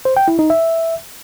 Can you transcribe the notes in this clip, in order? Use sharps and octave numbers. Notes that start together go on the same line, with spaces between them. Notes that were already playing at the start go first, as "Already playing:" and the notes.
C5
G5
E4
D#4
E5